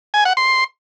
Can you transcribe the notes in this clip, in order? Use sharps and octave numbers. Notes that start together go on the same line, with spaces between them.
G#5
F#5
C6